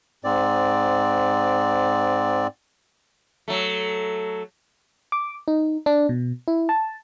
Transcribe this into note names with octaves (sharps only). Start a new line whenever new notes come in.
G#2 C4 D5
F#3 A3
D6
D#4
D4
B2
E4
A5